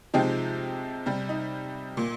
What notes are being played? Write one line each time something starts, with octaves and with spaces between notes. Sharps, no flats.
C3 F3 G#3 D#4 G4
C3 G3
D#4
A#2